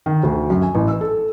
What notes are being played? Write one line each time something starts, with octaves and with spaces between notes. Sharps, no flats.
D#3
D2
F#2
G#5
A1
E6
A4